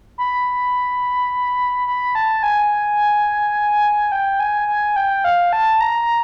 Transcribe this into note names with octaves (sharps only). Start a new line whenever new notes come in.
B5
B5
A5
G#5
G5
G#5
G#5
G5
F5
A5
A#5